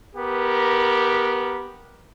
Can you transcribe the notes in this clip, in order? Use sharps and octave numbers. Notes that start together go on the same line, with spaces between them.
B3 G4 A#4